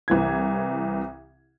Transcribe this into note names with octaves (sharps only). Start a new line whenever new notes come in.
C2 E3 G#6